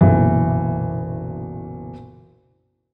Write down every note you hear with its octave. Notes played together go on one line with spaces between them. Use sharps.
F#1 B1 A#2 E3